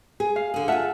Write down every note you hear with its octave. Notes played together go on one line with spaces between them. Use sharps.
G#4
F5
D3 G#4
F4 G#4 E5 F#5 A5